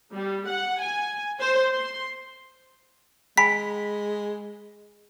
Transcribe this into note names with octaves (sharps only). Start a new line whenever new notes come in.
G3
F#5
G#5
C5
C6
G#3 G5 G#5 B5 B6